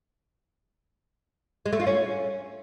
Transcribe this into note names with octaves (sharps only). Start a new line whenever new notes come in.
G#3
A3
F4
C#4